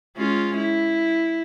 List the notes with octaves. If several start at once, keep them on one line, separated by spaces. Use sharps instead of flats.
G#3 C#4 F4
E4